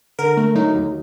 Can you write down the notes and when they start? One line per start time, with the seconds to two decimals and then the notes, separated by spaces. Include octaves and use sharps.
0.19 D3 A#4
0.37 A3
0.55 F#3 D#4
0.74 D#2